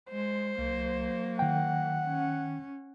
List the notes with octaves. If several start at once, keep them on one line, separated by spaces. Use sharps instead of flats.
G#3 C5
C2 F#3 A#3
D#3 F#5 G5
C#4